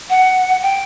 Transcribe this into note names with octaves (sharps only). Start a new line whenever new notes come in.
F#5
G5